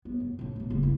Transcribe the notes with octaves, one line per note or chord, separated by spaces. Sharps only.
B3
F#2
A2 D4
A1 B2
F#1 C#2
E4